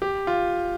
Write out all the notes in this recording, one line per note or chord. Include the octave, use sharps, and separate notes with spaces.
G4
F4